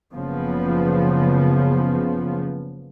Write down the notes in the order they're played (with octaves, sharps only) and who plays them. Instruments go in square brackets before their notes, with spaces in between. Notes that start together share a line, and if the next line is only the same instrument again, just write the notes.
[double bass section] F#1 C#3 F3 B3